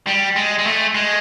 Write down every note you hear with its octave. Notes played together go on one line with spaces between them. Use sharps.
G3
G#3
G#3
A3
G#3